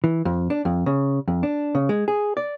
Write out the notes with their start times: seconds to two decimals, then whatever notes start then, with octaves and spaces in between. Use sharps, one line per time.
0.04 E3
0.25 F2
0.50 D4
0.65 F2
0.86 C#3
1.28 F2
1.43 D4
1.75 C#3
1.89 G#3
2.08 G#4
2.37 D5